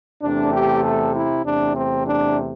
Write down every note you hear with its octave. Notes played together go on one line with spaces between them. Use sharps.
E2 C3 A3 D4
G4
A4
E4
E2 C3 A3 D4
C4
D4